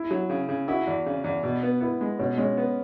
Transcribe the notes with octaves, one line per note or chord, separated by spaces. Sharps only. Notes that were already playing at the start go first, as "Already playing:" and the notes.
Already playing: E4
F#3
C#3
C#3
E4 F#4
E2
C#3
E2
B2
B3
B3 E4
G#3
B2 C#4
G#3 C#4
B3